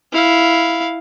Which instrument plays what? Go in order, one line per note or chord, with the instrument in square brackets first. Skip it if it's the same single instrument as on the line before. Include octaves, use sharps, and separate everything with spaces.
[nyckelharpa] E4 F5